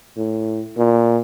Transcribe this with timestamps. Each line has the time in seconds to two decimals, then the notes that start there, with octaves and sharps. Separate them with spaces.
0.17 A2
0.78 A#2